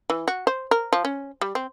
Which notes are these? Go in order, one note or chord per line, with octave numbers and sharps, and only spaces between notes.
E3
F#4
C5
A#4
F3
C#4
G3
C4